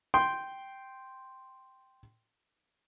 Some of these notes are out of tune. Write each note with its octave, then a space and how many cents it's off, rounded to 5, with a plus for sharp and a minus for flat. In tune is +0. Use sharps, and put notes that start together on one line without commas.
G5 -5 C6 +0